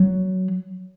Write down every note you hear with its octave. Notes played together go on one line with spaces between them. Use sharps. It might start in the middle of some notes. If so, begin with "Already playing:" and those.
Already playing: F#3